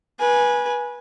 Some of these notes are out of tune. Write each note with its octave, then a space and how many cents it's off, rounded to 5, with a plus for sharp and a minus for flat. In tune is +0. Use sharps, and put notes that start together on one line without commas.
B4 -20 G#5 +0